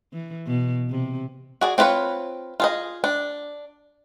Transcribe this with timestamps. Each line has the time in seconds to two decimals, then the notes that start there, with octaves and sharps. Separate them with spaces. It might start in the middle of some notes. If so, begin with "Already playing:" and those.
0.13 E3
0.47 B2
0.90 C3
1.61 F#4 G#4 D5
1.78 C4 D4 F4 B4 C#5
2.60 F4 G#4 D#5
3.04 D4